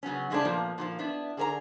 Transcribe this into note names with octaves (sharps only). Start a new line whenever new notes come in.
C#3 F#3 B3 C#4
G#2 C#3 G#3 A3 C4 D4
A#2 F3 A#3 B3
A#2 D#3 F3
B3 D4 E4
D3 G#4 A#4 C5 A#5